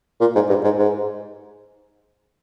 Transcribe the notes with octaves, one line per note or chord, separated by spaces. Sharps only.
A#2
G#2
G2
G#2
G#2